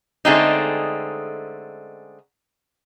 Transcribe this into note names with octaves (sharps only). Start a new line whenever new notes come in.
D3 G#3 A3 C4 C#4 D#4